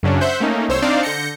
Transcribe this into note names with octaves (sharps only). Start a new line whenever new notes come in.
F#2 C#3 F#3 C#4 D4
C5 E5 F#5 G6
A3 A#3 C#4 D#4
C2 C5 C#5 E6
C4 D4 D#4 C5 D5 F5
D3 G6 A#6 C#7